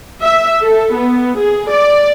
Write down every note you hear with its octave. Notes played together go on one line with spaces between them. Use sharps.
E5
A4
B3
G#4
D5